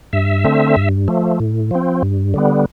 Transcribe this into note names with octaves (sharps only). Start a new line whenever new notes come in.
G2 E5
D3 A3 C4
G2
F3 A3
A2
F3 C4
G2
D3 G3 B3